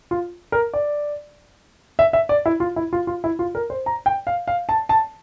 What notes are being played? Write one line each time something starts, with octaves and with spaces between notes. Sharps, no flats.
F4
A#4
D5
E5
E5
D5
E4
F4
E4
F4
F4
E4
F4
A#4
C5
A#5
G5
F5
F5
A5
A5